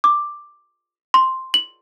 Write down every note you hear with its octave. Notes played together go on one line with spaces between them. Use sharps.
D6
C6
F#7